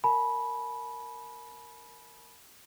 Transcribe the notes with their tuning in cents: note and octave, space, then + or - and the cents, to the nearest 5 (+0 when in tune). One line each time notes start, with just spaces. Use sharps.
A#4 -10 G#5 +45 B5 -15